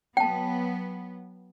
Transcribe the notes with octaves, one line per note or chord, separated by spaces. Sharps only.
F#3 B3 G5 A5